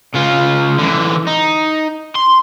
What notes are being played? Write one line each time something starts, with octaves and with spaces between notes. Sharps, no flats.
C#3 F4
D3 E3
D#4
C6